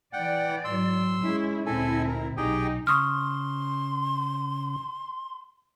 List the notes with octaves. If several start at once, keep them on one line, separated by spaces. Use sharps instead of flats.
E3 D5 F#5 G5
G#2 F#3 C6 E6
G#3 C#4 E4
D2 A#2 C4 E4 A4 G#5
A#4
B1 D#4 G4 G#4 G5
C#3 C6 C#6 D#6 F6